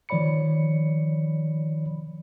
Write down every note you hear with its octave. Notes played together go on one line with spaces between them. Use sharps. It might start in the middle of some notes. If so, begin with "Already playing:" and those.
D#3 F3 C#5 D5 B5 C#7